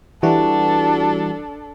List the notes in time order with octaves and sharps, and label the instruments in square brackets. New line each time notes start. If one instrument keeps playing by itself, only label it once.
[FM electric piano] E3 G3 F#4 [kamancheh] D4 A4